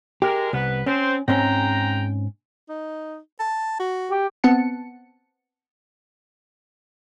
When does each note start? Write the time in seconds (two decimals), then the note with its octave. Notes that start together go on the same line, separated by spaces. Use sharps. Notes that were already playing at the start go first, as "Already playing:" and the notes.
0.22 G#3 G4 A#4
0.53 C2 B3 B4
0.86 C4 C#4 C5
1.28 G#2 G#3 C4 C#4 G5 A#5
2.69 D#4
3.40 A5
3.80 F#4
4.11 G4
4.44 B3 C4 F#5 A5 C#7